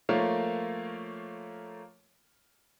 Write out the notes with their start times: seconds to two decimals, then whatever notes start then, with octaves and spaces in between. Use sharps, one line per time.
0.09 F3 A3 A#3 F4 A#4 C#5